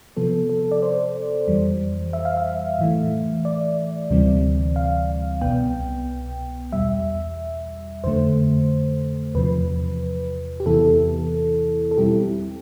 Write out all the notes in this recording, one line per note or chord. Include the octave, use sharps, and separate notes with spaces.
C3 F3 B3 A4
A4
D5
C5
F2 E3 G3
E5
F5
E5
A2 E3 A3
D5
D2 C3 E3 G3 C4
F5
C2 B2 B3 G5
E2 B2 G3 E5
F2 D3 A3 C5
E2 C3 F3 B4
G4
E2 C3 E3 B3 E4 A4
A4
B2 G3 C4 E4 G4